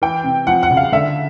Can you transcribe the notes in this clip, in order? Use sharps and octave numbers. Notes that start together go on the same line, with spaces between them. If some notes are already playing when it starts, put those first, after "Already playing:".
E3 G5
C3
F3 F#5
F#5
C#3
F5
D3 E5